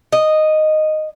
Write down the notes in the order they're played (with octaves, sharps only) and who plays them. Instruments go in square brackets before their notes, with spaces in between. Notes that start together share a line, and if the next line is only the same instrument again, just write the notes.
[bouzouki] D#5